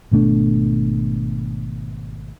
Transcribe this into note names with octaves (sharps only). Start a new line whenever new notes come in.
G#1 B2 A3 D4